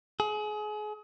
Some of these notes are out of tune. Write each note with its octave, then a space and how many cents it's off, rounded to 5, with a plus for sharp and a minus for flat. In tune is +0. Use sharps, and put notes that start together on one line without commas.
G#4 +30